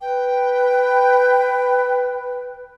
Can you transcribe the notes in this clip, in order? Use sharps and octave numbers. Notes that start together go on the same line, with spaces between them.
B4 G5